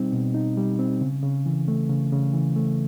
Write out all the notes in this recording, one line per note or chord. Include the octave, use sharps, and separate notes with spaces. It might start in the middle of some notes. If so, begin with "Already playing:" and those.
Already playing: B2 G3 C4 D#4
B2
D#4
G3
C4
C#3
C#3
E3
A3
C#3
C#3
E3
A3